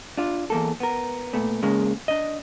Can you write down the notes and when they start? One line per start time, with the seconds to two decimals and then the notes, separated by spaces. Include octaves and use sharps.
0.17 D4 F4
0.50 E2 A#3 A4
0.80 B3 A#4
1.33 A#2 A3 B3
1.63 C#3 G#3 A#3
2.08 D4 D#5